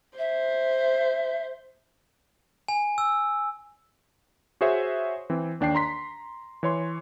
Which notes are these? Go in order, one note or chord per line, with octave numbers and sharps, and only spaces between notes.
C5 E5
G#5
E6
F#4 G#4 C5 C#5 E5
E3 C4
D#2 D4 G5 C7
A#5 C6 B6
E3 C#5 C6